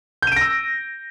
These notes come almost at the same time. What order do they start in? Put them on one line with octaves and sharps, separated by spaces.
G6 D#7 D7 A#6 E6